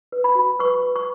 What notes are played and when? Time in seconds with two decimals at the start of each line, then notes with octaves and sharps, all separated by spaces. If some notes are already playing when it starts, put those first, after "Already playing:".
0.12 B4
0.24 B5
0.35 F#4
0.59 B4 C#6
0.83 B4
0.96 C#6